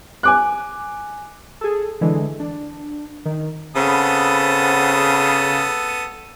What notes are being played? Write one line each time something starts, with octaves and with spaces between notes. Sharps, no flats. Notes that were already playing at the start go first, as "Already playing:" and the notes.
G#5 D6 F#6
G#4 A4
D3 E3 G#3
D4
D#3
C#3 B3 C4 A4 F#5 B5 D#6